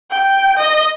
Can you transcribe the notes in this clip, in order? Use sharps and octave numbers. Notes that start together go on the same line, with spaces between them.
G5
D#5